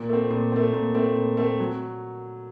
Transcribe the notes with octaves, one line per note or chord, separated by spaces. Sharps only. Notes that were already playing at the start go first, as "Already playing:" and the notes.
Already playing: A#2
A3 C4
A#2
A3 C4
A#2
A3 C4
A#2
A3 C4
F#3